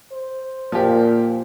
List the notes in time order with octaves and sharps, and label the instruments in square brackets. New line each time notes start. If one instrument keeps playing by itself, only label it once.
[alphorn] C5
[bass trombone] A#2 [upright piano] F3 G4